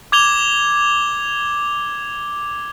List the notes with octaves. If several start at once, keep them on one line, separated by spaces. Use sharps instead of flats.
D6 G#6 F7 G7